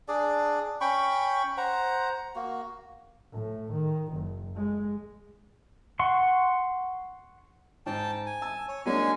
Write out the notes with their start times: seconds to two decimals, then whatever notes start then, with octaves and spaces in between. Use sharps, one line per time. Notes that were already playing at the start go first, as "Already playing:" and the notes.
0.08 D4 G#4 D5
0.81 C#4 G5 B5 C#6
1.57 C5 F#5 A#5
2.36 A#3 F#4
3.32 A2
3.73 D#3
4.13 F#1
4.56 G#3
5.99 F#5 C6 C#6
7.86 G#2 G5 A5
8.26 G#5
8.42 A5 E6
8.68 C#5
8.86 F#3 G#3 A#3 C#4 D4 G#5